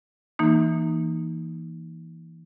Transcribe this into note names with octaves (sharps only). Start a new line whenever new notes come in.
E3 A#3 D#4